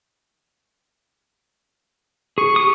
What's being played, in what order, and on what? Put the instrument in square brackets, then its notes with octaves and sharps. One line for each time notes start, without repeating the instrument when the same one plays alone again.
[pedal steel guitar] G#4 [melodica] C#6
[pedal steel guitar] G4 D#6